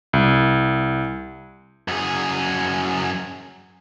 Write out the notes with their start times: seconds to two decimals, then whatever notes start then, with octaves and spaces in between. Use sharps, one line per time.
0.13 C2
1.88 F#2 G#4